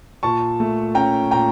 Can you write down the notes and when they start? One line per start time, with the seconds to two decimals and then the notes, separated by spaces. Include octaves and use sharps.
0.23 A#2 A5 C#6
0.60 A3
0.95 C#4 G5 A#5
1.31 A#2 G5 A#5